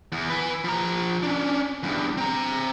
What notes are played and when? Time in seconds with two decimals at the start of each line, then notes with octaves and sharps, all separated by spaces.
0.12 E2
0.30 B4 G#5
0.64 F3 A#5
1.23 C#4 D4
1.83 E2 G2
2.17 C4 A#5